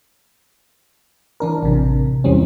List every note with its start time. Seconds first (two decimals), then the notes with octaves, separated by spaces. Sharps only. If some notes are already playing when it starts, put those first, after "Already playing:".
1.40 E3 D4 A#4
1.63 A1 C3
2.24 E2 E3 G3 C4 C#4